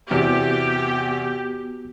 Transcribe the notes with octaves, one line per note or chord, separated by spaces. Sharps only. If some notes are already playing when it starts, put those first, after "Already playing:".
E2 C3 B3 F#4 G4